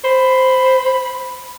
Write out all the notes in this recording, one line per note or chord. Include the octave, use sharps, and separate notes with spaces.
C5 B5